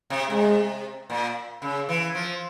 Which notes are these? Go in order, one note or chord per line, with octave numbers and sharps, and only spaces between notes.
C3
C3 G#3
A#2
C#3
E3
F3